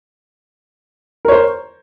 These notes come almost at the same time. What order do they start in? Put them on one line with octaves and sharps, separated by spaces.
A#4 C#5 C5